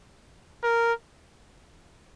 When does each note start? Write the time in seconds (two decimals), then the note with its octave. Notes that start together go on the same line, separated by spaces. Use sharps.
0.64 A#4